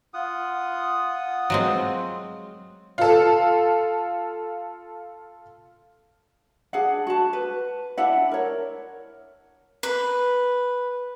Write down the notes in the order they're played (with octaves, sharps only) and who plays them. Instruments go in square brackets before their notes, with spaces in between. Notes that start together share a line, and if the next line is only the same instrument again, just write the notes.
[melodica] F4 F#5 D#6
[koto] F#3 G#3 C4
[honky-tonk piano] F4 A4
[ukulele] D4 G#4 F#5
F#4 A5
B4
D4 E4 F#5
A#4 C#5
[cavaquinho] B4